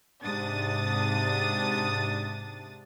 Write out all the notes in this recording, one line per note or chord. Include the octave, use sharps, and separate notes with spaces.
G#2 C3 D4 D#6 A6